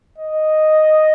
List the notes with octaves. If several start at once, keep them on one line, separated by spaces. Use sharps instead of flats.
D#5